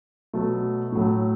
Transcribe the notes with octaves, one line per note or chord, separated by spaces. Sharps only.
B2 F#3 A3
A2 F#3 A3